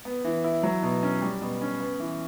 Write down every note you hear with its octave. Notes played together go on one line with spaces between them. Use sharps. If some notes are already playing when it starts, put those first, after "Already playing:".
B3
E3
E4
F#3
B2
C#4
G3
B2
C#4
B3
E3